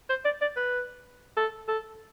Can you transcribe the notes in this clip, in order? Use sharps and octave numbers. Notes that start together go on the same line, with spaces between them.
C5
D5
D5
B4
A4
A4